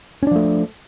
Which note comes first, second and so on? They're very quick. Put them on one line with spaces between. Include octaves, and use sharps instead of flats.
C#4 D4 F3 A3